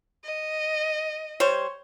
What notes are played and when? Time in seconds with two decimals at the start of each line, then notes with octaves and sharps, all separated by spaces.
0.24 D#5
1.40 G3 C5 C#5